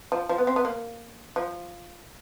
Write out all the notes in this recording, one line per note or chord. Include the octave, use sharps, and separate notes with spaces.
F3
F3
B3
C4
B3
A#3
F3